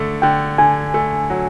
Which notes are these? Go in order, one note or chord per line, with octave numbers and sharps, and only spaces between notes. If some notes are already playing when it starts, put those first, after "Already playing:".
Already playing: D3 A3
D3 G5
D3 G#5
A3
F#3